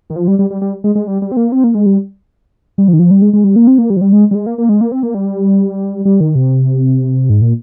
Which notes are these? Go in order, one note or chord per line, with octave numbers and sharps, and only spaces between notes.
D#3
F3
G3
G3
G3
G3
G#3
G#3
G3
G3
C4
A#3
C4
A#3
G#3
G3
G3
F3
D#3
F3
G3
G#3
G#3
G3
A#3
C4
A#3
G3
F3
G3
G#3
G3
G#3
A#3
A#3
G#3
A#3
C4
A#3
G3
G3
D#3
C3
G#2
A#2